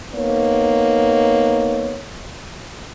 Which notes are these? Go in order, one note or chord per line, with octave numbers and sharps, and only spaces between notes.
A#3 B3 D#4 C#5